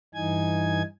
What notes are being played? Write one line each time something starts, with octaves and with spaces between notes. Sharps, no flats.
G2 E3 D#4 G#5 G#6